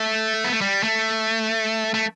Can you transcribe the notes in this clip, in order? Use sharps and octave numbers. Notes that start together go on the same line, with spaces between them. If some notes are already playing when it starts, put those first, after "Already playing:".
Already playing: A3
B3
A3
G3
A3
A3